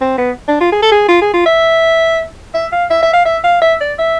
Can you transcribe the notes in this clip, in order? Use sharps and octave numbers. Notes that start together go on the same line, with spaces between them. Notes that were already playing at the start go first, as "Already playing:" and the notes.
C4
B3
D4
F4
G#4
A4
G#4
F4
G#4
F4
E5
E5
F5
E5
E5
F5
E5
F5
E5
D5
E5